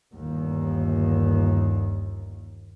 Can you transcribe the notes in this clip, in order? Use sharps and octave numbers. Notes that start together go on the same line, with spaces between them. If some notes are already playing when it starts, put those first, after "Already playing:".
G1 D#2